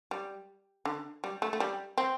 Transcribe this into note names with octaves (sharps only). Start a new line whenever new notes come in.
G3
D3
G3
A3
A3
G3
C4